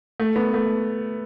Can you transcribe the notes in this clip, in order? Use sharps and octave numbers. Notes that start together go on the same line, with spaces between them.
A3
B3
A3